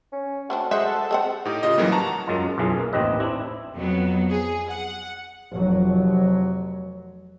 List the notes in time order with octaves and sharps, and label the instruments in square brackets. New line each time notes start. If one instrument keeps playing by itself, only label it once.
[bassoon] C#4
[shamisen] A3 C4 D4 [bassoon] F#4
[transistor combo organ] G#3 C5 F#5 [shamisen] E5
[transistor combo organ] A4
[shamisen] G#3 C4 F#5
[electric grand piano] A2 D#4 G4
C#3 F4 D#5
G#2 C#3 E3 F#3 G3 A#3
F#5 A5 A#5 C#6
[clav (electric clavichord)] F#2 F#3 G#3 F4 A5
B1 F#2 E3 F4 G#4 F5
A#3
A1 D#2 C4 G4 B4 D#5
C4 D4 E4
[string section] F2 F#3 B3
G#4
F#5
[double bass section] F1 F#3